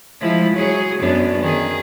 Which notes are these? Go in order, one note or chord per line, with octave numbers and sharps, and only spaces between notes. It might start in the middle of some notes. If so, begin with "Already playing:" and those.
F3 G#3 E4
F#3 G#4
F#2 B3 D4
D#3 G#4